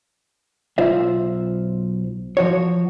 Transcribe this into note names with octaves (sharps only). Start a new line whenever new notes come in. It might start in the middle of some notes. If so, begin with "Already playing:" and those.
B1 F4 C5 E5
F3 F#4 C#5